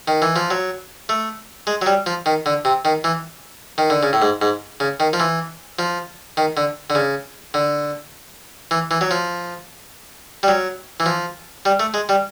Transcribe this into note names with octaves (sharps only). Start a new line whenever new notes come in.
D#3
E3
F3
F#3
A3
G#3
F#3
G3
F3
D#3
D3
C3
D#3
E3
D#3
D3
C#3
A2
G#2
G#2
C#3
D#3
F3
E3
F3
D#3
D3
D3
C#3
D3
E3
E3
F#3
F3
G3
F#3
E3
F3
G3
A3
G#3
G3